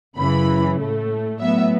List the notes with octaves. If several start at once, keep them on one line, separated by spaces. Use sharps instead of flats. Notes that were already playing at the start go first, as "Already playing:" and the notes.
F#2 C#3 E3 B5
A2 A3
A2 F#3 B3 E5